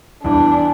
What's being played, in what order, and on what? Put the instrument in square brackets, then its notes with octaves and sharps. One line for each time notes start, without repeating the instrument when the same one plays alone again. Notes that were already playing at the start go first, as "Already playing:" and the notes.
[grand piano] E2 E3 G3 [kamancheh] D4